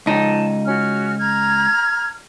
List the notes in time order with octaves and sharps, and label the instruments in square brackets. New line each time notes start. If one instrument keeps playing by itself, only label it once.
[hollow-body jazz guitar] C#2 D#4 [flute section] A5
[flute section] C#4 F#4 F6
A#5 F6 G#6